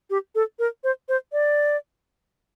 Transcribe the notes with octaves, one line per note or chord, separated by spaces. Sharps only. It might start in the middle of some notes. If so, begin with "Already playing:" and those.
G4
A4
A#4
C5
C5
D5